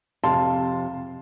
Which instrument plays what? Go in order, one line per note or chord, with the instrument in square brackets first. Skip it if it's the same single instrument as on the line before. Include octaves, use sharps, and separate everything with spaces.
[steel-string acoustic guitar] F2 C3 [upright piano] F5 A5 C6